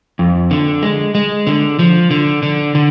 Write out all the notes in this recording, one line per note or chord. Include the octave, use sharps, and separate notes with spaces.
F2
D3
G#3
G#3
D3
F3
D3
D3
D3